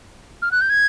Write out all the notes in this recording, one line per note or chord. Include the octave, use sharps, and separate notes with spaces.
F6
F#6
G6
G#6